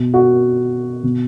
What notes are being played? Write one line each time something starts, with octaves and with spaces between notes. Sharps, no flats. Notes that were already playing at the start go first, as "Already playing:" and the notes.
Already playing: B2
F#4
B2